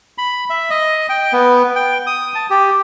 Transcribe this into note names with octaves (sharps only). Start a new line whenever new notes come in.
B5
E5
D#5
G5
B3
G5
D#6
A5
G4